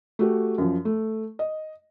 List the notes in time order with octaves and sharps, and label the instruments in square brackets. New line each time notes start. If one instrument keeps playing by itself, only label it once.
[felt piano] A3 F#4 G4
F#2 F3
A3
D#5